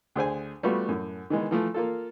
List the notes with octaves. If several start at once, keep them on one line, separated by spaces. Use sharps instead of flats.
D2 G#4 C5 G#5
G3 A3 B3 F4 F#4
F#2 A2
D#3 E3 G#3 B3
E3 F3 A3
A#3 F4 A4